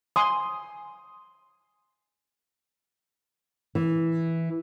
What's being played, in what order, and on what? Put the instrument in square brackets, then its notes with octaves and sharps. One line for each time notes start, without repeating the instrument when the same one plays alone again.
[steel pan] G#5 C6 D#6
[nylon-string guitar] E3